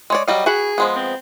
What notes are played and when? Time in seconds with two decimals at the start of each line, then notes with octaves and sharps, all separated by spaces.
0.10 G#3 C#5 D5
0.28 F#3 G3 D#5 F5
0.46 F#4 G#4 F#5 B5
0.78 F3 G#3 B3
0.96 C4